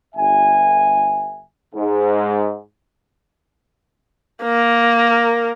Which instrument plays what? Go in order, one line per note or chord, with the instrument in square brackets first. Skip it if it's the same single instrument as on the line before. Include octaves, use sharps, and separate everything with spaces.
[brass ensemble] G1 E5 G#5
G#2
[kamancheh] A#3 A#4